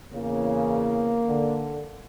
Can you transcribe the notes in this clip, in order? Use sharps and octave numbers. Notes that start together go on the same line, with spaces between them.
E2 C#3 A#3
D3